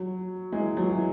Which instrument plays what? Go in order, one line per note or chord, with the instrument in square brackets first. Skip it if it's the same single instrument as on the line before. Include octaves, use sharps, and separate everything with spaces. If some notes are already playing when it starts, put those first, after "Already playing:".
Already playing: [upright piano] F#3
E3 G#3
F#3
E3